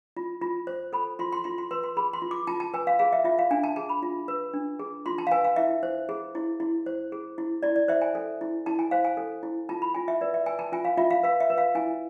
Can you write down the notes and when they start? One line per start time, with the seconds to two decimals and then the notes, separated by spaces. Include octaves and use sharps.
0.17 F4
0.42 F4
0.67 C5
0.93 A4 B5
1.19 F4 C6
1.32 C6
1.44 F4 C6
1.58 C6
1.71 B4 C6
1.84 C6
1.97 G#4 B5
2.13 C6
2.22 F4
2.31 D6
2.47 F4 A5
2.60 A5
2.74 B4 G#5
2.87 F5
2.99 G#4 F5
3.13 E5
3.25 F4 E5
3.39 F5
3.51 D4 G#5
3.64 A5
3.76 G#4 A5
3.89 B5
4.03 F4
4.28 B4
4.53 D4
4.79 G#4
5.06 F4 C6
5.18 A5
5.27 F5
5.31 B4 G#5
5.44 F5
5.56 E4 E5
5.83 C5
6.09 G#4
6.35 E4
6.60 E4
6.86 C5
7.12 G#4
7.38 E4
7.63 E4 D5
7.76 D5
7.88 C5 E5
8.02 G#5
8.15 A4
8.41 E4
8.66 E4 A5
8.79 G#5
8.91 C5 F5
9.05 G#5
9.17 A4
9.43 E4
9.69 F4 A5
9.82 B5
9.94 F4 G#5
10.08 E5
10.21 B4 D5
10.34 E5
10.46 B4 G#5
10.59 A5
10.72 F4 G#5
10.85 F5
10.97 F4 E5
11.10 F5
11.23 B4 F5
11.40 E5
11.50 B4
11.58 F5
11.75 E4 G#5